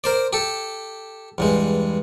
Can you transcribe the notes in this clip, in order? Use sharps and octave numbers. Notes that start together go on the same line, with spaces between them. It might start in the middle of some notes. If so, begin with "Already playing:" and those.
A#4 C5 D5
G4 A4
E2 G2 G#3